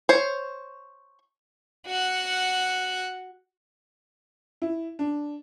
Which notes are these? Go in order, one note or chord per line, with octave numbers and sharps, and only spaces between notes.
C5 C#5
F#4 F#5
E4
D4